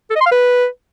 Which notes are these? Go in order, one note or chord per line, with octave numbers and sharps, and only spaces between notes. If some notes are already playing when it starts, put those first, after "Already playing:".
A4
D#5
C6
F5
B4